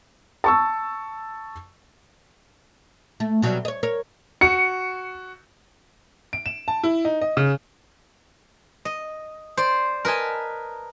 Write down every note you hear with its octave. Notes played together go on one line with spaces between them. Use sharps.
A5 C#6 E6
A3
B2 F#3 G3
C#5 D#5
A#4 C#5
F#4 C#7
D7
E7
A5
E4
D#4
D#5
C#3
D#5
C5 D5
A#4 B4 D#5 G#5 A5